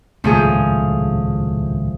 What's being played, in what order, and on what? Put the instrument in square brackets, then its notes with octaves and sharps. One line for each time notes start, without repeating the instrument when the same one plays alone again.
[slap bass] D#1 C#2 A2 [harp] F3 A3 G#4